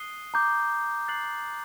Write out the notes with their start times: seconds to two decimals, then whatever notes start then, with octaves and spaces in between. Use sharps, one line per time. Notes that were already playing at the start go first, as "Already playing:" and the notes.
Already playing: D#6 F#6 C7 D#7 G7
0.34 A#5 D6 G6
1.08 F#6 A6 C7 F#7